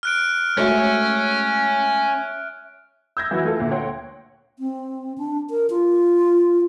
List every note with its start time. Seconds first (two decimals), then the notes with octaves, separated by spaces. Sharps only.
0.03 F6 F#6 D7
0.57 G#3 A3 C#4 F#4 C#5 E5
3.17 E6 G6 G#6 A#6
3.31 E3 F#3 E4 F#4 B4
3.45 A3 F4 A4
3.60 D2 A#2
3.71 C#5 F#5 G5 C6
4.59 C4
5.18 D4
5.50 A#4
5.70 F4